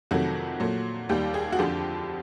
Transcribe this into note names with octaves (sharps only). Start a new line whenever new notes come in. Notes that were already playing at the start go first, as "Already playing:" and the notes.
F2 C3 D#3 F#3 A3 F#4
A#2 F#3 A3
D#2 D#3 G3 G4
G#4
F#4
F2 D3 F3 G4